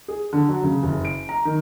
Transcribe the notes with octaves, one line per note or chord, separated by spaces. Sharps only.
G#4
D3
F#3
C#3
F#1
D7
A#5
D#3